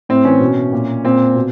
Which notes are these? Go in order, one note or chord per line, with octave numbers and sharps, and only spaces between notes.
A2 C4
E3 C#4
B2
A#2
A#2 C4
B2